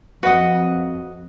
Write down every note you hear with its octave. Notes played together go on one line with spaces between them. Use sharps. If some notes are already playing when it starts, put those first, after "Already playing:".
F2 F#4 B4 D#5 F#5